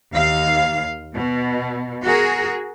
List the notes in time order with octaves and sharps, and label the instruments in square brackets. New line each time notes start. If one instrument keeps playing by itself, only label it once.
[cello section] D#2 F5
B2
F#4 G#4 A#4